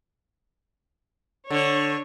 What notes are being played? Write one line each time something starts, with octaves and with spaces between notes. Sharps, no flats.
D3 C#5